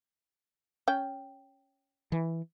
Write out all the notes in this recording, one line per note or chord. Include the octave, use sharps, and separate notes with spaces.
C#4 G5
E3